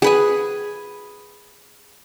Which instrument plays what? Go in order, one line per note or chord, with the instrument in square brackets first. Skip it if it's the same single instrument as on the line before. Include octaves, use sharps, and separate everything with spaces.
[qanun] G#4 B4 G#5